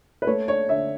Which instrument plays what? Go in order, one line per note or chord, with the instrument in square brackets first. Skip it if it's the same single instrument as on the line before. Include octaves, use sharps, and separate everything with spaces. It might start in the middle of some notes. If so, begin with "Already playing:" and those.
[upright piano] B4
A3 C#5
D4 C#5
D3 E5